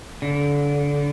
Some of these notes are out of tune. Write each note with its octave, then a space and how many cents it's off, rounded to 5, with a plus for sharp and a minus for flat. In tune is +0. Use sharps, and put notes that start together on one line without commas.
D3 -30